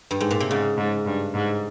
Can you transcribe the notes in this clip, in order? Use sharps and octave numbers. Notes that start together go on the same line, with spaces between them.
G2
G#2
A#2
C3
G#2 C#3
G#2
G2
G#2